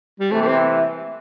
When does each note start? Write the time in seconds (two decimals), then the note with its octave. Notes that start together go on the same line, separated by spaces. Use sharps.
0.20 G3
0.31 C3 E3 A3
0.42 A3
0.47 C4